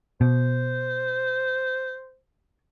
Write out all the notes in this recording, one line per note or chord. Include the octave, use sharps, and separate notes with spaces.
B2 C5